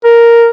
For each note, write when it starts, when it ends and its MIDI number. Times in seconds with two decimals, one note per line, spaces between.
0.04 0.49 70